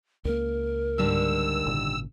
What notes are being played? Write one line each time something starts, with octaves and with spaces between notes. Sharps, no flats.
C#2 A#3 A#4
G#2 D3 G3 E6
G#1 A#2 C#3